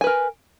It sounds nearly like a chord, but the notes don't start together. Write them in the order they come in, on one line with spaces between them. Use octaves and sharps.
G#5 B4 A#4